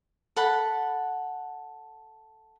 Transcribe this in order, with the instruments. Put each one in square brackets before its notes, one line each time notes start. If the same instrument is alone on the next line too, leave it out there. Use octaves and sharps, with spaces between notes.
[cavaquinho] A4 F#5 B5